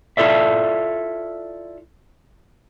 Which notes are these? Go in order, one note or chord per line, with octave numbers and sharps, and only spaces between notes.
E4 F4 A4 D5 E5